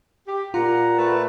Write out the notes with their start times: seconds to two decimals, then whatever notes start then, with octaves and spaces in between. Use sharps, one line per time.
0.27 G4
0.54 A#2 F4 F#5 A#5
0.98 A3 B4 A5